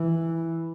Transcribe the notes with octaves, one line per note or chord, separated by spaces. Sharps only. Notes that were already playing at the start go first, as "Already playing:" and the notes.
Already playing: E3